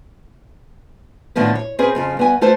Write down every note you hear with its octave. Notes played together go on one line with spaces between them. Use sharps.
A2 D3 D#3 F3 B3
C#5
C4 C#4 G#4 B4
F2 C#3 F4
G2 B3 G#5
A3 F4 A4 B4 C5